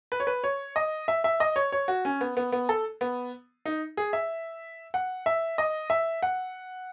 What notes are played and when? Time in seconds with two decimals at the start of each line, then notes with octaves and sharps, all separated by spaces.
0.12 B4
0.20 C#5
0.27 B4
0.44 C#5
0.76 D#5
1.08 E5
1.24 E5
1.40 D#5
1.56 C#5
1.72 C#5
1.88 F#4
2.05 C#4
2.21 B3
2.37 B3
2.52 B3
2.69 A4
3.01 B3
3.66 D#4
3.97 G#4
4.13 E5
4.94 F#5
5.26 E5
5.58 D#5
5.90 E5
6.23 F#5